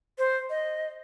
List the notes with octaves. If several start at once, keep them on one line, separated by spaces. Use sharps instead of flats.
C5
D#5